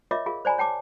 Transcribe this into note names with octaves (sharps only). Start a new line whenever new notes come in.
F4 A#4 C#5 D#5 E5 D6
F4 G#4 A#4 F5
C5 D5 G#5 A#5 B5
C#5 G5 A5 D6